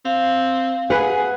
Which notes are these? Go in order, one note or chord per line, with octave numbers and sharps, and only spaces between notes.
C4 F5
G#4 B4 F#5